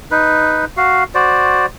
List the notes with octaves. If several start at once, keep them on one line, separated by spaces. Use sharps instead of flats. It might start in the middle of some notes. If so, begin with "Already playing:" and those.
D#4 B4
F#4 F5
F#4 C5 D5